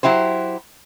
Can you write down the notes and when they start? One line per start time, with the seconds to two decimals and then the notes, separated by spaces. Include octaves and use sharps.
0.03 F#3 E4 G4 C5